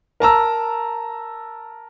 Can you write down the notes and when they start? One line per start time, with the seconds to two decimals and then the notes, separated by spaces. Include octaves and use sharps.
0.20 A#4 A5 A#5 E6